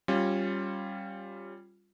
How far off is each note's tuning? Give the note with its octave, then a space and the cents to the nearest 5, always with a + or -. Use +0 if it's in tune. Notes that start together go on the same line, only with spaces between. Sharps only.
G3 +0 C#4 -20 F4 +5